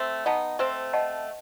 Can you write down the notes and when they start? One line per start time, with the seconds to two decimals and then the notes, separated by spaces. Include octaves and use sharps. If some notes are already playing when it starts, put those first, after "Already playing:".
Already playing: A3 C4
0.26 B3 D#4 D#5 F#5 A5
0.59 A3 C4 C5
0.93 D#5 F#5 A5